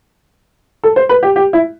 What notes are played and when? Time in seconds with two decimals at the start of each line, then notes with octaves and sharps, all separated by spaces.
0.84 A4
0.96 C5
1.09 B4
1.23 G4
1.36 G4
1.53 E4